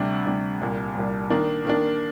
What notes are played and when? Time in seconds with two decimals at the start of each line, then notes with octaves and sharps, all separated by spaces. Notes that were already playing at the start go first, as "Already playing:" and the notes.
Already playing: D2 C3 G3 D4
0.26 D2 C3 G3 D4
0.61 C2 A#2 G3
0.95 C2 A#2 G3
1.30 D#3 A#3 D4
1.65 D#3 A#3 D4